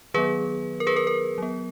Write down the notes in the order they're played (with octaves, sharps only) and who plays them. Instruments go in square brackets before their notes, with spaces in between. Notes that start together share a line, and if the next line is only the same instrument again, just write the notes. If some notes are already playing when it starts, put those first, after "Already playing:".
[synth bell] D#3 F#3 B3 G#4 B4
A#4
G#4 B4
A#4
A#4
F#3 B3